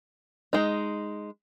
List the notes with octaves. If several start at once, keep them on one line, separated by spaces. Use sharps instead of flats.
G#3 D#4